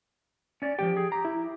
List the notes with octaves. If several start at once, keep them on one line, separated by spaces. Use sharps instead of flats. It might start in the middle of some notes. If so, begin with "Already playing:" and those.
C#4 D5
F3 G3 G4 G5
G#4
G4 A#5
E4